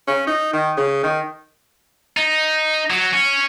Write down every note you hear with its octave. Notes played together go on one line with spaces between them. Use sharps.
C#4
D#4
D#3
C#3
D#3
D#4
F#3
C#4